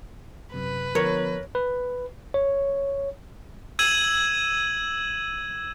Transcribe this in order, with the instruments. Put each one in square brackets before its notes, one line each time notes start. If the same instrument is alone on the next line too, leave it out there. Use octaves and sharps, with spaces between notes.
[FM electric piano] F#2 C3 [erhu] B4
[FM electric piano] D3 F3 B3 [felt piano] A#4 [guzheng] C#5
[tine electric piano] B4
C#5
[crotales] E6 G#6 D#7 E7 F#7